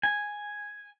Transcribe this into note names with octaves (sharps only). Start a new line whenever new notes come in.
G#5